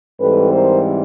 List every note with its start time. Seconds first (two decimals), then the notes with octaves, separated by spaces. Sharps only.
0.19 G#2 E3 G3 C4 A4 B4
0.51 A#4 C5